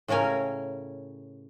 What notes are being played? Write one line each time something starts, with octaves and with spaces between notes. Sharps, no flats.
A2 C#3 C#4 A#4 G#5